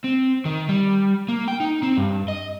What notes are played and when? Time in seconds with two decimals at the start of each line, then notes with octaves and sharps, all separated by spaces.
0.04 C4
0.45 D#3
0.69 G3
1.29 A#3
1.48 G5
1.60 D#4
1.83 C4
1.97 G2
2.28 D#5